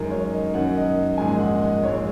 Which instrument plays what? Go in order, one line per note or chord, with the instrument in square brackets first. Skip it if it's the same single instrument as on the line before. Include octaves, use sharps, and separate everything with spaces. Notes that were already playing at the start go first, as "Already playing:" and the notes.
Already playing: [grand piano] F#2 D#3 G#3 A#4
C#5
D#5
F#2 D#3 A#3 C#4 F#5
D#5
A#1 G#2 D#3 G#3 C#4 G#5
D#5
F#5
D#5
A#1 G#2 G#3 C#5